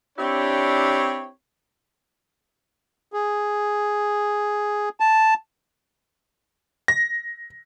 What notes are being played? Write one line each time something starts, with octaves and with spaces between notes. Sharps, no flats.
C4 D4 E4 G4 C#5
G#4
A5
A#6